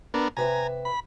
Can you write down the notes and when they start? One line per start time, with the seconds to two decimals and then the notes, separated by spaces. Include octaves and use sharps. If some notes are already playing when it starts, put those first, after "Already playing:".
0.14 B3 D4 A#4
0.37 C3 B4 E5 G#5 A#5
0.85 B5